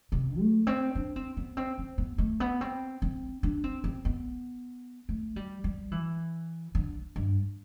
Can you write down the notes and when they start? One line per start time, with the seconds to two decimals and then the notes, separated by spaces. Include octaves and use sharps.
0.12 C3
0.40 A3
0.67 C4
0.95 D4
1.16 C4
1.37 B3
1.57 C4
1.78 C4
1.98 B3
2.18 A3
2.40 B3
2.61 C4
3.02 C4
3.43 D4
3.64 C4
3.84 C4
4.05 B3
5.09 A3
5.36 G3
5.64 G3
5.92 E3
6.75 D3
7.16 G2